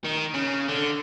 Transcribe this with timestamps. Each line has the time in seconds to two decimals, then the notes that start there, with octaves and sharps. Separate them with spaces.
0.04 D#3
0.34 C#3
0.69 D3